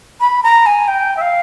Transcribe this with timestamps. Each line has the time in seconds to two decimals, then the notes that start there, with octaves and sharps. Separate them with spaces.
0.20 B5
0.43 A#5
0.66 G#5
0.88 G5
1.16 E5
1.21 F5